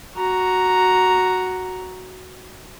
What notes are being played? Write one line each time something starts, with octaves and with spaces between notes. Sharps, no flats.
F#4 A#5